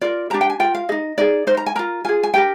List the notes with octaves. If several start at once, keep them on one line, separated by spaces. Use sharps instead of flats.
F4 A#4 D5
D4 G4 A#4 A#5
G5
G#5
F4 A#4 G5
F5
D#4 G#4 D#5
D#4 G#4 D5
D#4 A#4 C5
A#5
G#5
F4 A#4 A#5
F4 G#4 G#5
G#5
D4 G4 A#4 G5